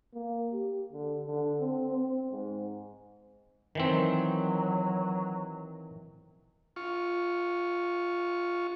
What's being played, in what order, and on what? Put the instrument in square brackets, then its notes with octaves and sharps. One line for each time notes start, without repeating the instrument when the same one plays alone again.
[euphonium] A#3
G4
D3
D3
C4
C4
G#2
[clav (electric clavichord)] D#3 E3 C4 [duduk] F#3
[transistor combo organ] F4 C#6